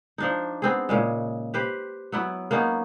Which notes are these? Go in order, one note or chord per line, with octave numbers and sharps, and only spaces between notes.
F3 D4 D#4
B3 C4 G#4
A#2 C#3 G#3
G4 B4 C5
F#3 B3 E4
A#3 B3 C#4 D#4